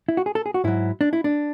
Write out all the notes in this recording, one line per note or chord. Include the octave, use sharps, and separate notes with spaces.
E4
F#4
G#4
A4
G#4
F#4
G#2 F#3 E4
D4
E4
D4